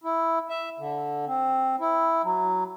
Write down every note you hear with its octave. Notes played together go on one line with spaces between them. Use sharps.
E4
E5
D3
C4
E4
F#3